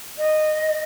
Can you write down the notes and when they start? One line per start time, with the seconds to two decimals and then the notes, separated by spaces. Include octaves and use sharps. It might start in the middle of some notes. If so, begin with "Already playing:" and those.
0.18 D#5